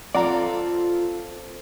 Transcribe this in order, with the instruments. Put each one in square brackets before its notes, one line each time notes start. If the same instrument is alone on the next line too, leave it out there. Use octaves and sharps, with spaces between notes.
[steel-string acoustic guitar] C4 A4 [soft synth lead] F4 [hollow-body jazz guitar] D5 F#5 A#5